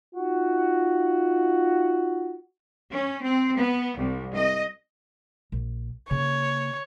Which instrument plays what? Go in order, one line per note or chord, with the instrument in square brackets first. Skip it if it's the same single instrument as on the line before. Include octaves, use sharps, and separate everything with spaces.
[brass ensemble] D#4 F4 F#4
[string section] C#4
C4
B3
C2
D#5
[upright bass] A#1
[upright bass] C#3 A#3 [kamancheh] C#5